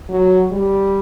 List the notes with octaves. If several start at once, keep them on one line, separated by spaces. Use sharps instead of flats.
F#3
G3